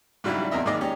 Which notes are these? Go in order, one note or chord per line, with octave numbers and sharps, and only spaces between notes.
G#2 C#3 F#3 G3 D4 E4
E2 C4 A#4 D#5 E5
G#2 D#3 A#3 G#4 D5 D#5
C#4 G4